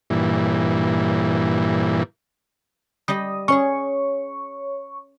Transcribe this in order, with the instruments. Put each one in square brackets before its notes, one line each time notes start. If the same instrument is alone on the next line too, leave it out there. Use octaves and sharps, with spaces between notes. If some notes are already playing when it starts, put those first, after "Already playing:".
[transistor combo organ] G2 A#2 E3
[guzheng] G3 G4 D#5 [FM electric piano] D#6
[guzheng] C#4 G#4 [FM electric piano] C#5 C#6